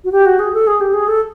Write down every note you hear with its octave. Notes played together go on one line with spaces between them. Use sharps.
F#4
G4
F#4
G#4
A4
G#4
G4
G#4
A4